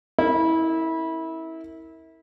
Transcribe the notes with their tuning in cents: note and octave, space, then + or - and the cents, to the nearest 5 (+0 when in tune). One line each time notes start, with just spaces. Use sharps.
C#4 -40 E4 -25 A#4 -25